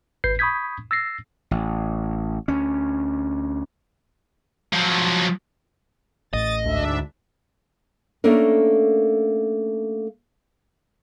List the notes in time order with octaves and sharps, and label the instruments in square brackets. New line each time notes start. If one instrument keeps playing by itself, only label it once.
[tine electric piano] G#1 B4 G6 C7
B5 C#6 D#6 G6 G#6 B6
E6 A6 A#6 C7
[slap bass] A1
D2 C#4
[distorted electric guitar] F3 F#3
[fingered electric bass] A1 A2 [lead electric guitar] D#5 [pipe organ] A6
[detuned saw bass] D2 [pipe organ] G#2 D4 E5
[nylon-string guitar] A3 A#3 C#4 D4 A4 A#4